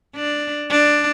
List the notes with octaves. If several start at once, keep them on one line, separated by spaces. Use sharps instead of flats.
D4
D4